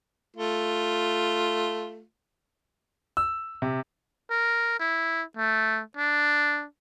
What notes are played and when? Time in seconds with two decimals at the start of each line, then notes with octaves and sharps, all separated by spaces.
0.36 A3 F4
3.17 E6
3.62 C3
4.30 A#4
4.80 E4
5.37 A3
5.97 D4